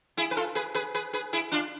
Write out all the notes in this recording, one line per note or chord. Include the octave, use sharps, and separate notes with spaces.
E4 G#4
B4
F4 A4
G#4 B4
G#4 B4
G#4 B4
G#4 B4
E4 G#4
D4 F4